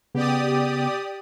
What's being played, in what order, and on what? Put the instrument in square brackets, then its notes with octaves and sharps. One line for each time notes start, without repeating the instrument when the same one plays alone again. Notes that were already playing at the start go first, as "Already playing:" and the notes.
[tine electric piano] C#3 B3 [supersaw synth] G4 D5 D#6